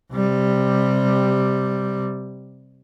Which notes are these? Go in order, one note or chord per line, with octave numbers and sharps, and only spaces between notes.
C3 G3